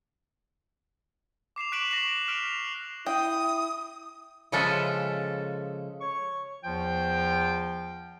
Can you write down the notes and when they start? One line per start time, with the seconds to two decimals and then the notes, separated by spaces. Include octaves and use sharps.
1.56 D6 C7 E7 F7
1.72 C#6 F#6 B6 D7 E7 F#7
1.91 C#6 A#6 C7 D7 E7 F#7
2.28 F6 B6 D7 F7
3.06 E4 G5 D#6
4.52 C#3 F3 G#3 C#4 A4 E5
6.01 C#5 C#6
6.64 E2 F3 F4 G5